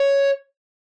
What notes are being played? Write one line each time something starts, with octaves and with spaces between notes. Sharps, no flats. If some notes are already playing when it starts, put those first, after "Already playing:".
Already playing: C#5